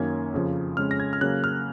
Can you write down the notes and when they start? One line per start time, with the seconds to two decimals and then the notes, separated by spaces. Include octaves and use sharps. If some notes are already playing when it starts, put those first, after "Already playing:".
Already playing: F#2 D#3 A#3 C#4 G#6
0.34 F2 C#3 F3
0.77 F2 C#3 G#3 C#4 F6
0.91 A#6
1.00 G#6
1.13 F6
1.21 C#3 F#3 A#3 F#6
1.44 F6